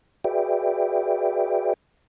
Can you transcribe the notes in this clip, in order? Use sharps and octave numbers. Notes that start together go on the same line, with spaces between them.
F#4 G#4 B4 D5 E5 G5